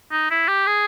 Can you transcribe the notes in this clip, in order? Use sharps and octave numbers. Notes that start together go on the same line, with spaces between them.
D#4
E4
G4
G#4